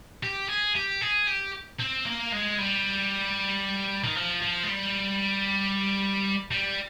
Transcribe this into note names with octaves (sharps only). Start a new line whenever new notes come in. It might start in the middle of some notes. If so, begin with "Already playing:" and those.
G4
G#4
G4
G#4
G4
C4
A#3
G#3
G3
D#3
F3
F3
G#3
G3
G3